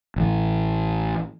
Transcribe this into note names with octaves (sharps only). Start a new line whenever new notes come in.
A1 E3